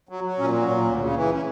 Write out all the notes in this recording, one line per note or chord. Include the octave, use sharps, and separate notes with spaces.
F#3
F#3
A#2 C#4
F#3
A#2
D2
C#3
E3
C#3